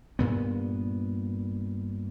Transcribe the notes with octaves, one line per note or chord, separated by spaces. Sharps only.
G2 A#2 B3